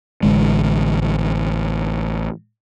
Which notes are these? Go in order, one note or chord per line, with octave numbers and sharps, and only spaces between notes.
A1 D3 G#3